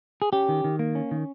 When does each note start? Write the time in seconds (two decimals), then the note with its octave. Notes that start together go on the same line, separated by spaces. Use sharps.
0.22 G#4
0.33 C#4 G4
0.49 D#3
0.64 D#3
0.79 A#3
0.95 C#4
1.11 D#3